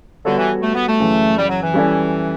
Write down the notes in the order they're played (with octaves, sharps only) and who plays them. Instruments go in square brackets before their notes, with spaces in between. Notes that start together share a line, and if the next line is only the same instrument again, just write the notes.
[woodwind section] D3 [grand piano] G3 B3 F#4 A4 C#5
[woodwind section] E3
A3
B3
A3
[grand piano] F#2 C#3 E3
[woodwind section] G3
F#3
E3
[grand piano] G3 C#4 E4 A4 D5